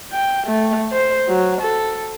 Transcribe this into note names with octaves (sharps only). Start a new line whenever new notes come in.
G5
A3
C5
F#3
A4